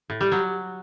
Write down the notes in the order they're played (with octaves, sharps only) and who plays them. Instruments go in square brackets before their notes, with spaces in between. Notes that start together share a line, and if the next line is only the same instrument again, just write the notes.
[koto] A2
G3
F#3